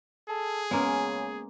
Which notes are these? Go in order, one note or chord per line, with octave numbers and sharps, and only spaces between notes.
G#4 A4
C#3 G#3 A#3 B3 C#4